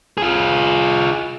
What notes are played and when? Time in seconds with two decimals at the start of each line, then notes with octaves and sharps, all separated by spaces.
0.18 F4 G#4